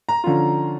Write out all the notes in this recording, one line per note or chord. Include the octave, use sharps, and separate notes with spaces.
A#5
D3 F3 C#4 F4